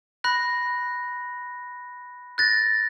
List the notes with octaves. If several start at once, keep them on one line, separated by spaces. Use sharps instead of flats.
B5 F#6 A#6
F#6 A6 A#6